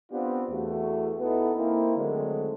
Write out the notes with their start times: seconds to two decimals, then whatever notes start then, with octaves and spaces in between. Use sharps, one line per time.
0.12 B3 C4 D4 F4 G4 B4
0.50 E2 A3 F#4
1.19 B3 D#4 E4 A4 B4
1.56 A#3 C4 E4
1.97 D3 D#3 F#3 G#3 A3 C4